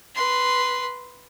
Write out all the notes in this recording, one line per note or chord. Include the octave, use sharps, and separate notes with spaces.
B4 C6